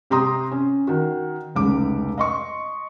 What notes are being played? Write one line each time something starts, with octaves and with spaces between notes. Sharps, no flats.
C3 G4 A#5 C6 D#6
C#4
D#3 F#4
F1 C#2 D6
D#5 C6 C#6